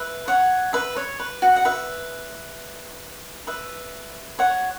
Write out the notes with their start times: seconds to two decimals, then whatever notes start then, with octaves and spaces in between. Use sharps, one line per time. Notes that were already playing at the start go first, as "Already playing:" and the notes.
Already playing: B4 E5
0.28 C#5 F#5
0.73 B4 E5
0.97 C#5
1.20 B4
1.42 F#4
1.56 F#5
1.65 B4 E5
3.47 B4 E5
4.39 C#5 F#5